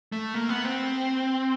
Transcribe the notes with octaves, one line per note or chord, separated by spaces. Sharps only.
A3
A#3
B3
C4